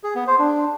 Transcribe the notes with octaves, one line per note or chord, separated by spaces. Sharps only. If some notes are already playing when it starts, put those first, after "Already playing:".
G#4
B3
C5
D4